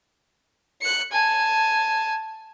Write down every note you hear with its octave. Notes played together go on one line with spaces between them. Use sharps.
F#6 C#7
G#5 A5